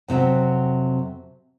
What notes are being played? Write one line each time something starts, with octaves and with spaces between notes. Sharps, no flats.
F2 C3 E3 F#3